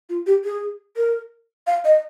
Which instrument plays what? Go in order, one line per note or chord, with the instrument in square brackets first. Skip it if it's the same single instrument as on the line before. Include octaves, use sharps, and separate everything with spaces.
[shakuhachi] F4
G4
G#4
A#4
F5
D#5